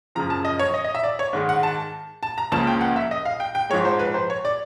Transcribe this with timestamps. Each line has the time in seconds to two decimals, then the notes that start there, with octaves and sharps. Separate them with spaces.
0.15 F#2 C#3 F3 A#5
0.30 A5
0.45 D#5
0.59 C#5
0.74 D#5
0.84 D#5
0.95 E5
1.03 D5
1.19 C#5
1.33 G#2 D#3 G#3
1.49 F#5
1.63 A5
2.23 A5
2.38 A#5
2.52 C#2 C#3 F3 A#3 C#4 A5
2.67 G5
2.81 F#5
2.96 E5
3.11 D#5
3.25 F5
3.40 G5
3.55 G5
3.70 G#2 F3 G#3 C#5
3.85 C5
3.99 B4
4.14 C5
4.30 C#5
4.45 D5